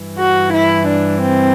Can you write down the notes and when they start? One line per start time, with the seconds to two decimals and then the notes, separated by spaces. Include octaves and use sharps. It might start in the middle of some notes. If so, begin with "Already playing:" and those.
Already playing: G2 E3
0.19 F#4
0.53 E4
0.87 D4
1.21 C4